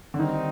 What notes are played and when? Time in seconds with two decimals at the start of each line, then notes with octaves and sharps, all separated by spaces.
0.14 D3
0.19 D#3 G3 C4 D#4